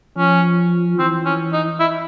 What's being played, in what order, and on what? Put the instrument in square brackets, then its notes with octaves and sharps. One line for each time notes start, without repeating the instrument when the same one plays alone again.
[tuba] F3 [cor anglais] C#4
[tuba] E3 [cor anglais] C4
[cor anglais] C#4
D#4
E4